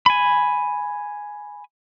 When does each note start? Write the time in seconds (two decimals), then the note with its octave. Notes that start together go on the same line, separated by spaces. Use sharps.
0.06 G#5 B5